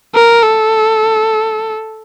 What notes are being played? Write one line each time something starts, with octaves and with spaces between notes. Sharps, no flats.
A#4
A4